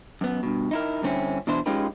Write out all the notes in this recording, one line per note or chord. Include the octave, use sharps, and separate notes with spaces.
F#2 B3
G2 B2
D#4 E4 A#4
G2 D3 C4 C#4 E4
B2 E3 D4 E4 C5
G#3 C#4 D#4 F4 G4 B4